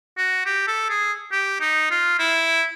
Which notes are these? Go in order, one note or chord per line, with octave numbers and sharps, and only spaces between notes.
F#4
G4
A4
G#4
G4
D#4
F4
E4